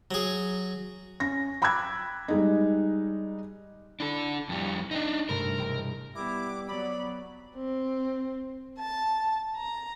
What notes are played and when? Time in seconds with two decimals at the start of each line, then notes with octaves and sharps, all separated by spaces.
0.11 F#3 G#4
1.20 C#4 A#6
1.62 G5 B5 D6 E6 F#6 G#6
2.28 G3 G#3 D#4
4.00 D4 E4 A4
4.49 F2 G3
4.91 D4 D#4 D#5 E5
5.29 G2 C3 A3 A#4
5.58 E1 G5 A#5
6.16 G3 B3 E4 D6
6.68 F#3 B3 D5 B5
7.55 C4
8.79 A5
9.55 A#5